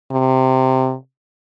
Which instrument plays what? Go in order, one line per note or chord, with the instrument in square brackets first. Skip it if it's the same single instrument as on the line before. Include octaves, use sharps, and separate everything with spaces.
[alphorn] C3